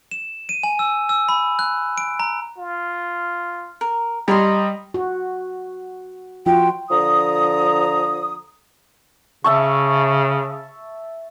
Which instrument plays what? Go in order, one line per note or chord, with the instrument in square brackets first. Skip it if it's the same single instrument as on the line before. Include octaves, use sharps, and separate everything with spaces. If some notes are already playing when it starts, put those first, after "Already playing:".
[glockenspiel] E7
D#7
G#5
E6
E6
B5
F#6
D7
A#5
[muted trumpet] F4
[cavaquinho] A#4
[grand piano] G3 [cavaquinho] C#5 A#5 C6 [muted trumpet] D#5
[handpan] F#4
[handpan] F3 F4 F#4 [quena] G5
[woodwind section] D3 F3 A#5 D#6
[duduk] C#3 [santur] E5 A5 C#6